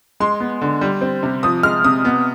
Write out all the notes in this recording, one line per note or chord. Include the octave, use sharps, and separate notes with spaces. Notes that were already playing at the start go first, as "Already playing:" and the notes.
G#3 C6
B3
D3
G3
C4
C3
F3 D#6
G#3 F6
C3 D#6
B3